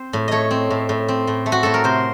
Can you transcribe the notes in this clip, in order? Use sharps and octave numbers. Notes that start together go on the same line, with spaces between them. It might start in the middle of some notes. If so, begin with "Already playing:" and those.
Already playing: C4 C5
A2
A3 C#5 D#5
C4
A2
A2
C4
A2
A3
F#4
A2 A4
A#4
C3 C5